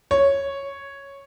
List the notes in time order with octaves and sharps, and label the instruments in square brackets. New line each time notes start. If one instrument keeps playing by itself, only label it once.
[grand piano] C#5